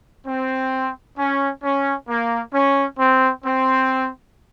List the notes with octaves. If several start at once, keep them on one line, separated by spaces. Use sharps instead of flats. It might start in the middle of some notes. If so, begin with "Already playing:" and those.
C4
C#4
C#4
A#3
C#4
C4
C4